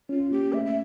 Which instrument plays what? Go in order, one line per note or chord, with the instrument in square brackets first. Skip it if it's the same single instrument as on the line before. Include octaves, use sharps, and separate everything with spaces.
[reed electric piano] C#4 [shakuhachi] F4
[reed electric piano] A#3 [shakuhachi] G4
[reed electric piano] A3 [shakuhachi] E5
[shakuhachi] E5